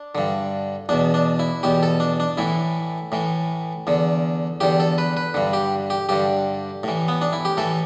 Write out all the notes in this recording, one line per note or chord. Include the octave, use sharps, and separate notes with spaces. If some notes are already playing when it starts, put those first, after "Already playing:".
Already playing: D4
G2 D3
E2 B2 D4
D4
E4
E2 B2 G4
A4
D4
D4
A2 E3 E4
A2 E3
E2 D3
E2 D3 G4
A4
B4
B4
G2 D3
G4
G4
G2 D3 G4
A2 E3
B3
D4
E4
G4
A2 E3 A4